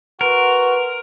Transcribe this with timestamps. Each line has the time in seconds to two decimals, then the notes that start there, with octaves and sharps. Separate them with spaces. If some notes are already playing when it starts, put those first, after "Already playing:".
0.21 F#4 A#4 B4 C6